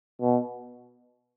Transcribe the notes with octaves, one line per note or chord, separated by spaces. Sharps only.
B2